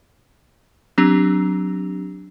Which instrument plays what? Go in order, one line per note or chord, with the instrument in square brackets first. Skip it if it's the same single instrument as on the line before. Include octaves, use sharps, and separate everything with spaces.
[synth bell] F#3 C4 D4 G4